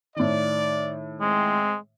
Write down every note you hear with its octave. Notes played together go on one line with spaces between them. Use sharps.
A2 D#3 D5
G#3 C4